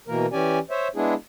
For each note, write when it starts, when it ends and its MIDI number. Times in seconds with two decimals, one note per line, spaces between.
0.08 0.26 47
0.08 0.26 52
0.08 0.26 58
0.08 0.26 70
0.32 0.59 52
0.32 0.59 61
0.32 0.59 67
0.32 0.59 74
0.32 0.59 80
0.71 0.88 72
0.71 0.88 73
0.71 0.88 76
0.95 1.14 56
0.95 1.14 59
0.95 1.14 62
0.95 1.14 64
0.95 1.14 68